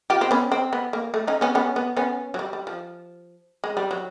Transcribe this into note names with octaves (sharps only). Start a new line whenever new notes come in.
F4 G4
C4
B3 C#4
C4
B3
A#3
A3
C#4 D#4
B3 C#4
B3 C#4
B3
B3 C#4
F#3
G3
G3
F3
G#3
G3
F#3